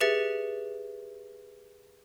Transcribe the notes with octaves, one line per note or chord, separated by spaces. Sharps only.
G4 G#4 B4 E5 A6 C#7